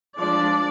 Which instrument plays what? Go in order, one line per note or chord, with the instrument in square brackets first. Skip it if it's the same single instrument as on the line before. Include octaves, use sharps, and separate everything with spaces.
[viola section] F3 G#3 D4 D5